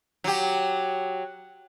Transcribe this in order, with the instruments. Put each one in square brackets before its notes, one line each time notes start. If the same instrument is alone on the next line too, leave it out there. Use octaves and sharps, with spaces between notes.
[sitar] F#3 G4